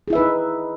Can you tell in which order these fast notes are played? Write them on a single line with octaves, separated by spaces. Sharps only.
G#4 E4 E5 B4 D#4